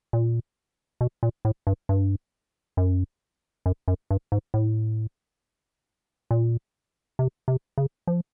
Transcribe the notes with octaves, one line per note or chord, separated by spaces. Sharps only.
A#2
B2
A#2
A2
G2
G2
F#2
F#2
F#2
G2
G#2
A2
A#2
C3
C3
C#3
F3